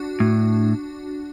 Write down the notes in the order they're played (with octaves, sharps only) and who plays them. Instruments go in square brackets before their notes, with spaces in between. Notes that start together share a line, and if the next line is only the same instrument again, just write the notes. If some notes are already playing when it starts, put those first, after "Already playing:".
Already playing: [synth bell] D4 F#4
[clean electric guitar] A2